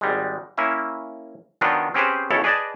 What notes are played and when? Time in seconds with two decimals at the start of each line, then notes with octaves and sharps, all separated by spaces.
0.01 G#1 G3 G#3
0.58 A#3 C#4 E4 E5
1.61 D#3 F#3 B3 D4 D#4 F4
1.94 C4 C#4 G4 G#4 B4 C5
2.30 B1 C#3 E4 A4 C#5
2.44 G#4 B4 D5 D#5 G#5 A5